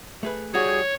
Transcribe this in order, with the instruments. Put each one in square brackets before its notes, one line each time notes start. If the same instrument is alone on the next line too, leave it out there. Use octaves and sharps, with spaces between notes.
[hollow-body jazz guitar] A3 G#4 B4
[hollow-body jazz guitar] G3 F#4 [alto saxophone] G#4 [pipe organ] C#5